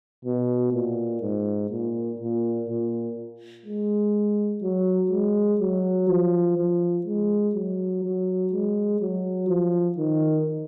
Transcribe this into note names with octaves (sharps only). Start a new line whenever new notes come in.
B2
A#2
G#2
A#2
A#2
A#2
G#3
F#3
G#3
F#3
F3
F3
G#3
F#3
F#3
G#3
F#3
F3
D#3